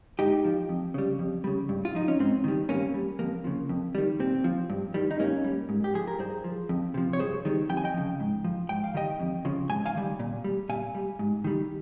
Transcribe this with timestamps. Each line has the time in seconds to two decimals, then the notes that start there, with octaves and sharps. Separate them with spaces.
0.19 G#2 D#4 G4
0.44 F3
0.69 F2
0.94 C#3 G3
1.19 F2
1.44 C#3 G3
1.69 G2
1.85 F4
1.95 F3 D#4
2.08 C#4
2.19 G#2 C4
2.44 D#3 G3
2.69 G2 A#3 C#4
2.94 G3
3.19 F2 A#3
3.44 C#3 F3
3.69 F2
3.95 D#3 G3
4.20 A#2 C4
4.44 F3
4.70 G2
4.94 D#3 G3
5.11 D#4
5.19 G2 A#3 C#4
5.44 G3
5.69 G#2
5.84 G4
5.94 F3 G#4
6.08 A#4
6.19 G2 G#4 C5
6.44 F3
6.69 F2
6.94 C3 F3
7.13 C#5
7.20 G2 G#4 C5
7.45 D#3 G3
7.69 F2 G5
7.77 G#5
7.84 D#5 G5
7.94 C#3 F3
8.20 G#2
8.44 F3
8.69 G#2 G5
8.84 F5
8.94 D#3 G3 D#5 G5
9.20 F2
9.45 C#3 F3
9.69 G#2 G#5
9.86 F5 G#5
9.95 D#3 G3
10.19 A#2
10.44 G3
10.69 A#2 F5 G#5
10.95 G3
11.19 G#2
11.44 D#3 G3